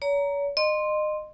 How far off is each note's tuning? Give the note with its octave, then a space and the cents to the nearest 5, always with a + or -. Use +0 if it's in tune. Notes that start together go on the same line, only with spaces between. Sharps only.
C#5 +40 A#5 +0
D#5 -30 C6 +0